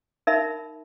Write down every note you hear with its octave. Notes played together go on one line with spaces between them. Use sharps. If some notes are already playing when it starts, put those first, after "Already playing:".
D#4 A#4 E5 B5